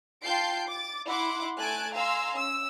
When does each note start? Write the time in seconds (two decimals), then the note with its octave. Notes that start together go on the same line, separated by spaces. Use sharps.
0.23 F4 G5 A5 G6 C7 D7
0.67 D6 A6
1.07 E4 F#5 C6 D6
1.57 A3 G#5 A5 F#6 G#6 D7
1.95 F5 G#5 A#5 C6 E6
2.33 C#4 E6